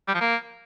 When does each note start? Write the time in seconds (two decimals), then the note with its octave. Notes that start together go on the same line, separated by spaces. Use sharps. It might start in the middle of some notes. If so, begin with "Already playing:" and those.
0.08 G3
0.14 F3
0.21 A#3